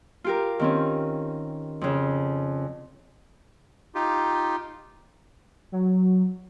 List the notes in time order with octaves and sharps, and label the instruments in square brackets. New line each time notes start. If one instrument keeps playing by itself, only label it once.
[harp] F4 G4 A#4
D#3 C4 C#4
F2 C#3
[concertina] D#4 F4 G4
[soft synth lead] F#3